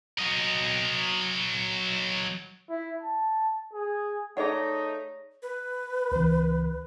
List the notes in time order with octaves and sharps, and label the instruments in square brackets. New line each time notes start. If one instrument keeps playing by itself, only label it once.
[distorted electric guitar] F#3 D#5
[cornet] E4
A5
G#4
[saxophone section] A3 D#4 [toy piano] G#4 D5 F#5 [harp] C#5 A#5
[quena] B4
[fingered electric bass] C#2 E3